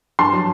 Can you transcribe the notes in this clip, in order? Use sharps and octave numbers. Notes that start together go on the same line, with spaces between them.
G2 A5 C6
F#3